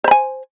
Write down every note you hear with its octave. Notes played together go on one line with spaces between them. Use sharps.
C5 G#5 B5